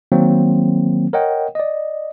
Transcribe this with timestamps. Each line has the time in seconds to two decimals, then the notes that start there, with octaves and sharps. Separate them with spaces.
0.12 D#3 F#3 A#3 C4
1.13 A#4 C#5 D#5 F#5 G5
1.55 D5 D#5